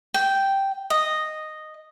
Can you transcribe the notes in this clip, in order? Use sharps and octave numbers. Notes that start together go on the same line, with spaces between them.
G5
D#5